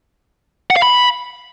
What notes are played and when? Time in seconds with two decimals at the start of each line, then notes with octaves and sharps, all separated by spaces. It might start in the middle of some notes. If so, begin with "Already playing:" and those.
0.70 F#5
0.76 F5
0.82 B5